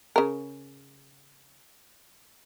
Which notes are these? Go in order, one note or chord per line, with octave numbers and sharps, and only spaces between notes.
C#3 A#4